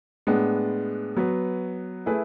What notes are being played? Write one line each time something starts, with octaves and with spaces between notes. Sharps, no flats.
A2 G#3 B3 D4
F#3 B3 F#4 B4
A3 E4 G#4 B4